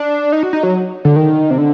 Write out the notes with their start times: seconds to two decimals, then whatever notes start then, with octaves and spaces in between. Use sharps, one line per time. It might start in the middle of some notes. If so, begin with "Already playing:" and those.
Already playing: D4
0.32 D#4
0.43 F#4
0.53 D#4
0.63 F#3
1.05 D3
1.16 D#3
1.51 C3
1.58 D3